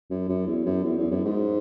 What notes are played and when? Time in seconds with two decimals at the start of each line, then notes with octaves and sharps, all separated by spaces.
0.10 F#2
0.29 F#2
0.47 E2
0.66 F#2
0.84 E2
0.98 E2
1.11 F#2
1.25 G#2